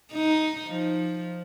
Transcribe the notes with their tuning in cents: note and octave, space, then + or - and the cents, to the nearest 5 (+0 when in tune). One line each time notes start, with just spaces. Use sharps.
D#4 +5
F3 +5